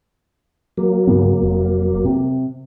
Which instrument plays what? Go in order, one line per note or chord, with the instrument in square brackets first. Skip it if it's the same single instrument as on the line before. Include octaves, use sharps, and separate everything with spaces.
[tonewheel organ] F#3 A#3
[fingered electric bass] G2 C#3 B3
F1
C3